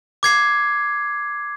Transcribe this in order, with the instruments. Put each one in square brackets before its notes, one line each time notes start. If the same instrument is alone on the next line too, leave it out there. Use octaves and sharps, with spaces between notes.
[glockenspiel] D6 G#6 C7